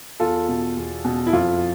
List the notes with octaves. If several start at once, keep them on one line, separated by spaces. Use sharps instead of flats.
E2 F4 A4
B2
E2
B2
E4
F2 F4